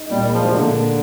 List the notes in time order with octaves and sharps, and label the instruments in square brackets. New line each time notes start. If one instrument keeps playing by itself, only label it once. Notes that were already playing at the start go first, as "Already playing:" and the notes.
Already playing: [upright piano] D#4
[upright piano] A#2 [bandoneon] G3
[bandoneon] F3 [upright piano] G#3
[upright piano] D4
[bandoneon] C3
D3
[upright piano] A#2